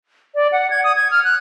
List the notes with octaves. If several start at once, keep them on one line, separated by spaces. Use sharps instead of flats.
D5
F#5
G#6
D#6
G#6
F6
F#6